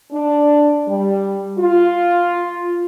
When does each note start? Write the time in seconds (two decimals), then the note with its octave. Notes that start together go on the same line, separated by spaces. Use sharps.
0.12 D4
0.88 G3
1.59 F4